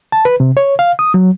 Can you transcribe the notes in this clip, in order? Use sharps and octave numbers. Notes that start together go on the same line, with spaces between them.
A5
B4
C3
C#5
F5
D#6
F#3